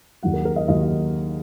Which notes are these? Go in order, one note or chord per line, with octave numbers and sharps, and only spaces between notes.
D#2 D#3 F#3 F#5
A#4
A#4
D#5
D#2 D#3 F#3 D#5